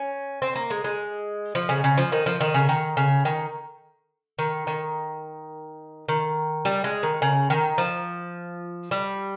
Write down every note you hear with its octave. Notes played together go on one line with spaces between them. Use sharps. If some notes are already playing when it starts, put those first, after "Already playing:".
Already playing: C#4
C4
A#3
G#3
G#3
F3
C#3
C#3
F3
D#3
F3
D#3
C#3
D#3
C#3
D#3
D#3
D#3
D#3
G3
G#3
D#3
C#3
D#3
F3
G3